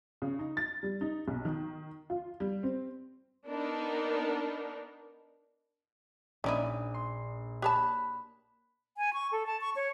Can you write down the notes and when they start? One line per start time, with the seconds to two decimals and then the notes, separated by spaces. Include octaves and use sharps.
0.22 C#3
0.39 D#4
0.57 A6
0.83 G3
1.01 D#4
1.28 B1
1.45 D#3
2.10 F4
2.40 G3
2.63 C4
3.46 B3 D4 D#4 A#4
6.44 A#1 C#4 D#4 E4 D5 D#6
6.94 C6
7.62 G4 C#5 A5 B5 F#6
8.97 G#5
9.13 C#6
9.32 A4
9.47 A5
9.61 C#6
9.76 C#5